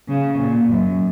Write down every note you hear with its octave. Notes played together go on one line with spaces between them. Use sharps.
C#3
A#2
F#2